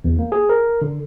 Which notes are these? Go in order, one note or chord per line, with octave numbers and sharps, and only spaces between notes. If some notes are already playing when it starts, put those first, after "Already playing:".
E2
A#3
G#4
A#4
D3